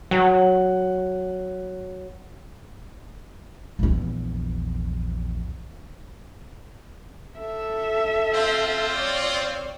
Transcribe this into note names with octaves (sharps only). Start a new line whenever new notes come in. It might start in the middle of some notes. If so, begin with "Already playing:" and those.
F#3 F#5
A#1 E2
A4 E5
C4 F4
C#5 D5